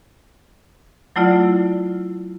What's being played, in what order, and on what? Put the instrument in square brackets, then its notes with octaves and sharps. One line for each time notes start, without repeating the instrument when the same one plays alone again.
[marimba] F#3 A3 E4 F4 D5